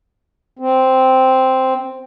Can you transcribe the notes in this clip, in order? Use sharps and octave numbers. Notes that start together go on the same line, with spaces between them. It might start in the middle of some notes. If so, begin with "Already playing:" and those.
C4